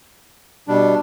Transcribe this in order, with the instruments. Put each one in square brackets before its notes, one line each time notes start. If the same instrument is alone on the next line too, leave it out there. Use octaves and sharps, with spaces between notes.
[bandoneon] B2 G3 D4